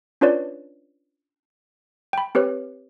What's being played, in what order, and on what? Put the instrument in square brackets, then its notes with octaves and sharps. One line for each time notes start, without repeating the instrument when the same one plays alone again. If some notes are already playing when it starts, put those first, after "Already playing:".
[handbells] C#4 D4 F4 B4 C#5 D5
G5 B5
C4 G4 B4 C#5